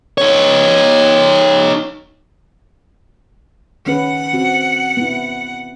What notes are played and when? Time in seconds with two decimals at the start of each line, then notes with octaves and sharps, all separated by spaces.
0.18 D#4 C#5
3.86 D#3 C#4 B4 F#5
4.33 C4 F#4
4.97 B3 E4